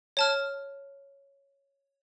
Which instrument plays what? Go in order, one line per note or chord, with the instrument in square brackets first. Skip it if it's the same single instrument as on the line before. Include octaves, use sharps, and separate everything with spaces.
[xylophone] C#5 A5 F6